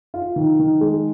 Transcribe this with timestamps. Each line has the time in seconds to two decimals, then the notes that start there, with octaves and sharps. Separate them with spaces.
0.14 F4
0.36 D#3
0.59 D#3
0.81 G#3